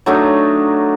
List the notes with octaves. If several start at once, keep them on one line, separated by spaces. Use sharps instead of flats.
F#3 A3 D4 D#4